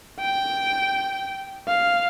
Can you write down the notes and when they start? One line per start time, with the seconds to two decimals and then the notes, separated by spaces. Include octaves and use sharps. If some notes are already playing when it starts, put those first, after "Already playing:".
0.20 G5
1.68 F5